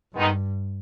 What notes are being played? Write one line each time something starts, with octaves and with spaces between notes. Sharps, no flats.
G2 D#3 G#3 B3 D#4